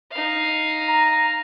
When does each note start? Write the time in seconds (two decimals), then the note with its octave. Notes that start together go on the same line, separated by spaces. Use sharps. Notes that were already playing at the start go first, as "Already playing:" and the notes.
0.11 D#4 F5
0.89 A#5